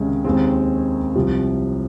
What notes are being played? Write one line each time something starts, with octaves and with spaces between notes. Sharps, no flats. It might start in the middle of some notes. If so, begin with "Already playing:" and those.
Already playing: C#2 C3 D#3 G#3 C#4
D#2 D#3 G#3 C4
C2 C3 F3